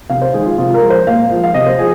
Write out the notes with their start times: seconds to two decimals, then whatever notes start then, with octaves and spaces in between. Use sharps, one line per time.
0.10 C3 F5
0.22 C5
0.33 D#3 G#3 G#4
0.46 F4
0.58 C3 F4
0.74 A#4
0.82 F3 G#3
0.90 C5
1.07 A#2 F5
1.30 F3 G#3
1.44 F5
1.54 C3 D#5
1.66 C5
1.79 F3 G#4